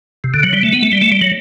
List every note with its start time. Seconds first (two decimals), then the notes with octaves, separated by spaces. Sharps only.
0.24 C3
0.34 D3
0.43 F#3
0.53 G3
0.63 A3
0.73 B3
0.82 A3
0.92 G3
1.01 A3
1.12 G3
1.21 F#3